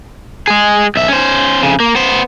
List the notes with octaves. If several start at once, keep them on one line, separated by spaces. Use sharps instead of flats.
G#3 G#4
B1 E5
C#4 C5
F2 C#3
A#3
B3 C5